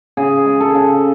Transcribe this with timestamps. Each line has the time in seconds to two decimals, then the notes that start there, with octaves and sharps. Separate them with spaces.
0.17 C#3 G#4
0.46 G#3
0.60 A4
0.75 C#3